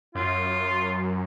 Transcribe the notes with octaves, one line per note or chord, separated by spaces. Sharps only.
F#2 F4